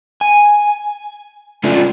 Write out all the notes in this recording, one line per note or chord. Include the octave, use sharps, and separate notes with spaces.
G#5
G#3 A3 C#4 D4 F4